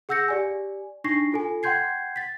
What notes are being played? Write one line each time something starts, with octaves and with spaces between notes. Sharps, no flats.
G#4 F#5 E6 G6 A#6 C#7
G4 D5 G#5
D4 D#4 C#6 A#6 C7
F4 A4 G#5
F#5 G5 C6 G6 G#6 C7
A6 B6